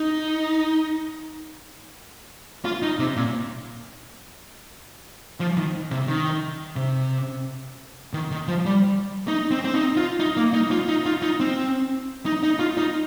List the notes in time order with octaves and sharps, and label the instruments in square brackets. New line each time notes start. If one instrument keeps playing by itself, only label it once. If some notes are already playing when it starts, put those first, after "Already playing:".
Already playing: [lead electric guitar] D#4
F4
D#4
C3
A#2
F3
D#3
C3
D#3
C3
D#3
D#3
F3
G3
D#4
C4
C4
D#4
F4
D#4
A#3
D#4
F4
D#4
F4
D#4
C4
D#4
D#4
F4
D#4